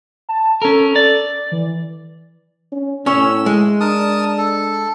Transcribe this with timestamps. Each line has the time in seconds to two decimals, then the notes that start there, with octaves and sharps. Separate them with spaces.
0.29 A5
0.62 C#4 A4 A#4
0.96 D5
1.52 E3
2.72 C#4
3.06 A2 C#4 C#5 E6
3.46 G#3
3.81 D4 A#4 A5 D#6
4.38 A4